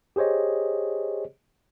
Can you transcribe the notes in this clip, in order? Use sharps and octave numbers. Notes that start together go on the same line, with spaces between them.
G4 G#4 C5 C#5 D#5